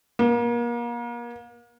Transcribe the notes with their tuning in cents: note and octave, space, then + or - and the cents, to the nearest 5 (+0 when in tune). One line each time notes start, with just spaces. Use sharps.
A#3 +35